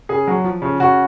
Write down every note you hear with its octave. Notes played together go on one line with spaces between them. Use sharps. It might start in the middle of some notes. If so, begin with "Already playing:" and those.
C#3 G#4
F#3
F3
C#3
C#3 F#4